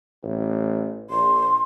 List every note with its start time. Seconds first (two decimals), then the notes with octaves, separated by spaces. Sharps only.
0.23 A1
1.10 A#1 C6